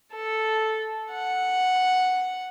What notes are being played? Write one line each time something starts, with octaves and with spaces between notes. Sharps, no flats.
A4
F#5